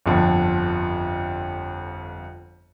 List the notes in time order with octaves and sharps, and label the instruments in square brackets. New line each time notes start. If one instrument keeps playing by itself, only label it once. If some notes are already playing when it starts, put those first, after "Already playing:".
[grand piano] G1 F2 D3